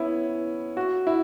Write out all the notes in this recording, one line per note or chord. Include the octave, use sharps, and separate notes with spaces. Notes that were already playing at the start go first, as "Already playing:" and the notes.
Already playing: B3 C#4 E4
F#4
E4